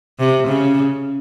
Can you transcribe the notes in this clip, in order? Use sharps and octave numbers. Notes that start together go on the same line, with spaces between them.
C3
C#3